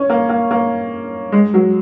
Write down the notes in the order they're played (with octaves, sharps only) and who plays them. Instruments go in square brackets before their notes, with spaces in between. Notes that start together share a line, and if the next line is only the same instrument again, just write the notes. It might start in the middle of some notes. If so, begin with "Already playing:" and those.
Already playing: [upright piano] C#4
A#3
A#3
A#3
G#3
F#3